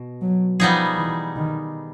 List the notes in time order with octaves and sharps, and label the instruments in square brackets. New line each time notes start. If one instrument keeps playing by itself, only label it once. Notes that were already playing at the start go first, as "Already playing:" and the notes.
Already playing: [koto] B2
[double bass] F#3
[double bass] F3 [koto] G3 B3 D#4 G#4
[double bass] E3
D#3